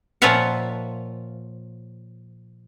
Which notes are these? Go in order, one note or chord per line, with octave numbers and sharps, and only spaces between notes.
A#2 F3 F4 C#5 E5 F#5